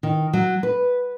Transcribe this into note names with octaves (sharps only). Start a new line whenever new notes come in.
D#3
F#3
B4